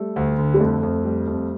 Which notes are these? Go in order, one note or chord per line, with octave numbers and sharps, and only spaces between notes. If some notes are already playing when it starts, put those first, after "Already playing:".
Already playing: G3 A3
D2
D3
G3
F2 A3
F2
G3
F2